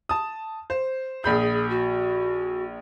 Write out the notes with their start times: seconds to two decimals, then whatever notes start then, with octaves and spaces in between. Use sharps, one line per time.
0.09 A5 D#6
0.70 C5
1.24 A#1 G#4 B5 G6
1.70 F#4